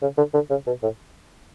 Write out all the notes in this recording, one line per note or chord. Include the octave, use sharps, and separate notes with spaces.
C#3
D3
D3
C#3
B2
A2